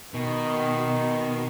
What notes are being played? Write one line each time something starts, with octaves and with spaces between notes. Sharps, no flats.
B2 D#3